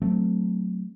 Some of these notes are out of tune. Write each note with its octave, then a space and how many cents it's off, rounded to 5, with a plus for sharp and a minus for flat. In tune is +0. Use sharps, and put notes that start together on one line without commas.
F#3 +0 A3 +0 C4 -15